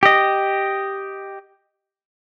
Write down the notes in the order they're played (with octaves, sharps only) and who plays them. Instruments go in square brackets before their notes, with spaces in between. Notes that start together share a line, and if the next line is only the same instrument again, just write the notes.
[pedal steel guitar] G4 D#5